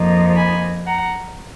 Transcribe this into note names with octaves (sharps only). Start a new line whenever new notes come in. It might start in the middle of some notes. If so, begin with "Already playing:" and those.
Already playing: F2 F3 A#3 D#4
G#5 B5
F#5 A#5